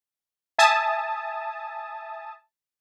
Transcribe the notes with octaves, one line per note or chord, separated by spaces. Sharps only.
E5 G#5 A5 D#6